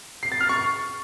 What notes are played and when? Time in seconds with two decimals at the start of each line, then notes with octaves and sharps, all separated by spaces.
0.23 C7
0.32 A6
0.40 F6
0.49 C#6